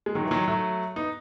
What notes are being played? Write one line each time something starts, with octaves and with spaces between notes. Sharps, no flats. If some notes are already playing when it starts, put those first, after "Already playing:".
G#3
D#3 F#3
E3
D#3 F#3
F#3 A3
B3 D#4